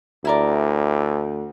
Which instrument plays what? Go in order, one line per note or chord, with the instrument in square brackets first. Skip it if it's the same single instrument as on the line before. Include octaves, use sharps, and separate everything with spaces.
[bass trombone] D2 [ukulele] E4 A#4 D5